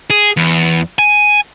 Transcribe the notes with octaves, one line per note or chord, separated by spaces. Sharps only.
G#4
E2
G#5